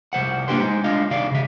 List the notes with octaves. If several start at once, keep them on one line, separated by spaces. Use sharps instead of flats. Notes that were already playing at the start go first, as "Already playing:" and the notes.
C2 D#3 C5 F#5
A#3 D4 F4 G4 B4 C5
G#3 D#4 C5
G#3 D4 F4 D#5 F5
C2 D#3 D5 F5
C#3 E5